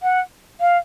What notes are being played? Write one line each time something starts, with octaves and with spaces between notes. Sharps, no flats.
F#5
F5